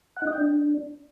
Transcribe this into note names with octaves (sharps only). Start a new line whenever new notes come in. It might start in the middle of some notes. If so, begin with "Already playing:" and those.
F#5
D#4
D#5
G5
D4